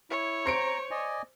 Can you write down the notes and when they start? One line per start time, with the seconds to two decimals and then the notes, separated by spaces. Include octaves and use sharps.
0.10 E4 C#5
0.45 C5 A#5 C#7 D7
0.91 D5 D#5 G#5